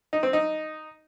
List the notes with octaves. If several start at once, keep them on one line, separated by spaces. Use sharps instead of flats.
D#4
C4
D#4